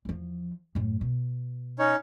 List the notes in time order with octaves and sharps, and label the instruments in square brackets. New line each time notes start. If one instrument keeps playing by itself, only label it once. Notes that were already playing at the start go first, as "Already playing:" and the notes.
[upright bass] E2 F3
F#2 A2
B2
[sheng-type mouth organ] C#4 D#4 C#5